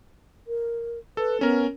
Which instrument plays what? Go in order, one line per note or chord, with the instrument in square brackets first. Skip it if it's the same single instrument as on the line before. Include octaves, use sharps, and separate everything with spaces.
[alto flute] A#4
[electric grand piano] A4 [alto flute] B4
[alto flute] B3 [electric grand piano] C#4 A#4